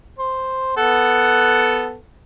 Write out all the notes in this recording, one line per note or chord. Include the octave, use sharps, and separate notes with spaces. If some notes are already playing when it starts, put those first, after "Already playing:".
C5
B3 A4 F#5